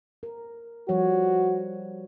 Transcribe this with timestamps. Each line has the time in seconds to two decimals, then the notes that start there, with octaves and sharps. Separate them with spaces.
0.23 A#4
0.89 F3 G3 F#4 C#5